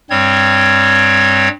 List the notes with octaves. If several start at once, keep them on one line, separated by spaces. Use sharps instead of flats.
G2 G3 C4 C#5 G#6